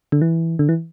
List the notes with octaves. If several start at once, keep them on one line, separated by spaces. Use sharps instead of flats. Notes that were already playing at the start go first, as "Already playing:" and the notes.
D3
E3
D3
E3